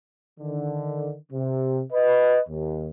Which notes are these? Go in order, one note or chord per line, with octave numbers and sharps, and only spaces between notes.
D3 D#3
C3
B4 D#5
D#2